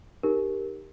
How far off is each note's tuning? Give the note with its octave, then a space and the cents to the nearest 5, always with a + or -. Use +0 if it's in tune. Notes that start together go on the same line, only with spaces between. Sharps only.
D#4 -15 G4 +10 A#4 +0